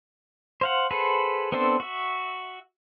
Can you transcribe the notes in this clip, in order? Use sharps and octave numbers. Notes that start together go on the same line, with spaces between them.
C5 F5 F#5
G#4 A4 B4 C5 F#5
B3 C4 D4 A4 C5
F#4 E5